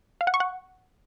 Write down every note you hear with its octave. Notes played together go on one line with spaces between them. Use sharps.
F5
F#5
C#6
F#5